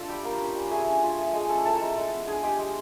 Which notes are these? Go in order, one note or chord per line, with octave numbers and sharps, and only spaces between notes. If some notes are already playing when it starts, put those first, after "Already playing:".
Already playing: D4 F4 A4
G3 G4 G5
A#3
C#4
G3
A3 G#4 G#5
D4
F4
A3
G#3 G#4 G#5
C#4 A4 A5
E4 A4 A5
A#5
G#3 A4 A5
G#3
B3
D4 G#4 G#5
G#3 G4 G5
G#3